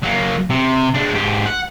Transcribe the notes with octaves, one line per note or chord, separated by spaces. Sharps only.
F#3 A#3
C3
G#3 D4
G#2 G4
F#5